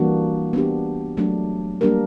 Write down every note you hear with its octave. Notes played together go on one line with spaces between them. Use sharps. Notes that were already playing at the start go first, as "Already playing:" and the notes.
Already playing: E3 G3 A#3 D4 F#4
B3 D4 G4
F#3 A3 D4
G3 A#3 D4 G4 A#4